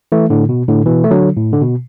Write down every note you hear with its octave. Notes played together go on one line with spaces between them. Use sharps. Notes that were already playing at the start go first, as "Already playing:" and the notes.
E3 A3
A2 D3
B2
A2 D3
B2 E3
A3
D3 F#3
A2
D3
B2